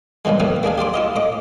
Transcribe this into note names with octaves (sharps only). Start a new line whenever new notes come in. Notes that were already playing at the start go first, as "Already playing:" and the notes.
G2 A#2 C#3 E3 G#3
A2 D#3 E3 F#3 B3
A#3 D4 G#4 F5
G4 D5 C6 D6
E4 F4 D#5
A2 D#5 D6